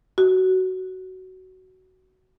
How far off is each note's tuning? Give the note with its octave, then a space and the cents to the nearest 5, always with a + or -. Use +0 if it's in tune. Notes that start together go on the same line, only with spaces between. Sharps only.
F#4 +15